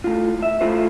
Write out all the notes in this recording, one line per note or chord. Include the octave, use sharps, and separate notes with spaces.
A2 F4
E5
A3 E4 F4 C5